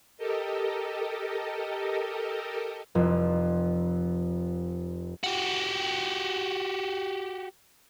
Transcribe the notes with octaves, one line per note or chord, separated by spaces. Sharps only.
G4 A4 A#4 D#5
F1 F2
F#4 G4